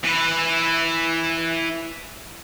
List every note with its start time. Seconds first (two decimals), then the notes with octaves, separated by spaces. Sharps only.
0.04 E3 B4